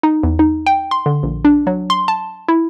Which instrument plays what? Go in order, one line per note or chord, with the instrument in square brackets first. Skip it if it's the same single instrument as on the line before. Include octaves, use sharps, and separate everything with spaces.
[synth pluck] D#4
E2
D#4
G5
C6
D3
A#1
D4
F#3
C6
A5
E4